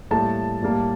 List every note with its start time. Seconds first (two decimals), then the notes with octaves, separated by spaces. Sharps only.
0.11 A2 G3 A#3 A5
0.62 A2 G3 A#3